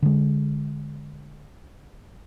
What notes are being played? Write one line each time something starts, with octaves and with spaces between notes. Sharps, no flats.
D3 G#3